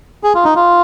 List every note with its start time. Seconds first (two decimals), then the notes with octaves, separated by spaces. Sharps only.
0.23 G#4
0.35 F4
0.44 D#4
0.56 F4